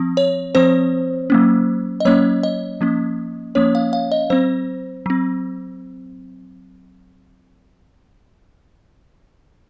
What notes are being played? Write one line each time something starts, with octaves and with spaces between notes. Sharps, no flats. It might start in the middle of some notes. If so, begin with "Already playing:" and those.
Already playing: F3 C4
C#5
F3 C4 C5
F#3 A#3 C#4
D#5
F#3 A#3 C#4 C#5
D#5
F3 A#3 C#4
F3 A#3 C#4 C#5
F5
F5
D#5
F#3 C4 C5
F#3 C4